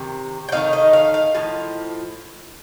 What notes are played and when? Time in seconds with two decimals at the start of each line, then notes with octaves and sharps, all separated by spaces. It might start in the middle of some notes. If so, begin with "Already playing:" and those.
Already playing: C3 D#3
0.49 G5
0.52 D#3 A3 C4 D#4 F5
0.73 D#5
0.93 F5
1.14 F5
1.35 A2 F3